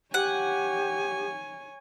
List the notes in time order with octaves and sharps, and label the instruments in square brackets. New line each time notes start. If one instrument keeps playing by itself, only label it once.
[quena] G4 [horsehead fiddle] C#5 G#5 [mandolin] F#5